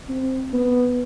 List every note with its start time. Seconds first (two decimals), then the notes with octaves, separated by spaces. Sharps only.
0.09 C4
0.53 B3